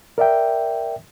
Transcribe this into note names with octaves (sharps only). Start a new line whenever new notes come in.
A#4 D5 E5 G5